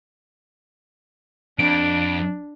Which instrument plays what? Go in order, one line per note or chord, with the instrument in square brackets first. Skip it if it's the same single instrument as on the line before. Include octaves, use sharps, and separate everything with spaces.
[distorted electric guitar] F2 [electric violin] D4 [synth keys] D7